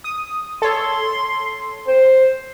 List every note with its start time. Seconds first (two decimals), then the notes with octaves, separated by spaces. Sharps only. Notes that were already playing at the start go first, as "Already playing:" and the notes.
0.04 D#6
0.62 A4 C#5 C6
1.88 C5